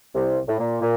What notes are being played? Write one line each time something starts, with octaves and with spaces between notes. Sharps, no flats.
C2 C3
A2
A#2
A#2